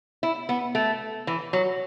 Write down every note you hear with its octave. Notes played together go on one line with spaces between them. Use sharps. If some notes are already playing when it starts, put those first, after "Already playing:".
E4
B3
A3
E3
F#3